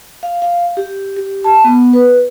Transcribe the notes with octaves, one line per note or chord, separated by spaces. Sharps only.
F5
F5
G4
G4
A5
B3
B4